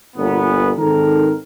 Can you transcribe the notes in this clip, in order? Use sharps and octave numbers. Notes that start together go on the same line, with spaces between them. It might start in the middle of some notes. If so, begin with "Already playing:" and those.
G1 A#2 B3
G#2 D#3 C4 A4 A#4